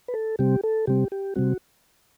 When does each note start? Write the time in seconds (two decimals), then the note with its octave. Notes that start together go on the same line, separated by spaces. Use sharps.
0.08 B4
0.14 A4
0.39 C3 G3 C4 G4
0.63 A4
0.87 C3 G3 C4 G4
1.12 G4
1.36 C3 G3 C4 F#4